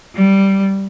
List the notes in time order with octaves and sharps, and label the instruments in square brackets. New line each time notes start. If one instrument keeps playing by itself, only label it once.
[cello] G3